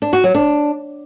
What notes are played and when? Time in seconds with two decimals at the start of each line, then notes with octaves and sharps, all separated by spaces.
0.02 D4
0.13 F#4
0.24 F#3
0.35 D4